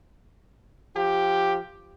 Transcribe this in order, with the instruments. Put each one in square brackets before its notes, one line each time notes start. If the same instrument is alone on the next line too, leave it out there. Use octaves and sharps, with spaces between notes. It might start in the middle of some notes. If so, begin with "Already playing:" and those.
[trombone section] F3 G4